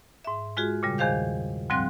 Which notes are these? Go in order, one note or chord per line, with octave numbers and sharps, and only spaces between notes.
G#2 E5
G#3 F4 F#4 G#4
A#2 C#3 G3
E2 D#3 G#4 C5 F5 G6
D2 G#2 F3 G3 C4 F#6